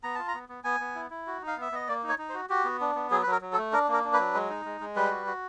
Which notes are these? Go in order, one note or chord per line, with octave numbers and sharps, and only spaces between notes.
B3 A#5
F4 A5
A#5
B3
B3
B3 G#5
B3
E4
E4
F#4
D#4
F5
B3 E5
B3 D#5
A#3 D5
D#4
C#5
D#4
C5
F#4
F#4 G4
B3
D4
B3
F#3 G#4
B4
F#3 A#4
F#3
A4
A3
D4 A#4
A#3 A#4
D4
B4
F#3
G#3
D#4
G#3
G#3
G3 B4
F#4
F#4